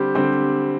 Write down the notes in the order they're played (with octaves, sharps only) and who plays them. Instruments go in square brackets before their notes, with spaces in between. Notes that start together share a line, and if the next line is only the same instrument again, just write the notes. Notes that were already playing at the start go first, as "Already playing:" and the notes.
Already playing: [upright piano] D3 G3 C4 G4 C5
D3 G3 C4 G4 C5